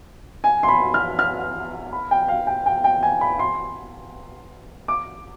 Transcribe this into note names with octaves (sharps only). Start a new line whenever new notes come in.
G#5
C6
B5
F6
F6
B5
G5
F5
G5
G5
G5
G#5
B5
C6
D6